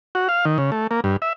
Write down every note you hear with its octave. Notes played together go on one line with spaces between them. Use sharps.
F#4
F5
D#3
C#3
A3
A#3
G2
E5